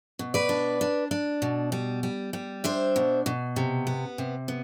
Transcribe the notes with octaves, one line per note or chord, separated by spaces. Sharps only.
B2
B4 D5
D4
D4
D4
B2
G3
G3
G3
D4 C5 E5
B2
B2
C3
B3
C3
B3